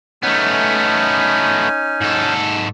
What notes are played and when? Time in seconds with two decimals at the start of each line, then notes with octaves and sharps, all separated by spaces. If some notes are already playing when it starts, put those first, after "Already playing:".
0.23 A3 B3 C#4 D#4 G#5
2.01 G#2 A4